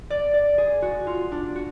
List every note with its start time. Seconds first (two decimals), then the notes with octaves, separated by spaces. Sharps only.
0.10 D5
0.34 D5
0.58 G#4
0.82 F#4
1.07 F4
1.32 D4
1.56 F#4